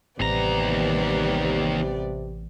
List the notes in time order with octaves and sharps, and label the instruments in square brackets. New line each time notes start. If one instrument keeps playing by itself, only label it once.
[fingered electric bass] A1 [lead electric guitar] D#2 A#5 [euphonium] C3 [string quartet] G3 B3 D5